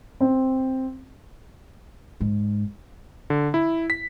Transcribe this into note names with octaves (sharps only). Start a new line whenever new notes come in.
C4
G#2
D3
E4
B6